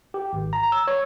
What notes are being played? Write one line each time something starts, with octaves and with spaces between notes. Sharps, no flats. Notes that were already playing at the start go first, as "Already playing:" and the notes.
G4
G#1
A#5
E6
C#5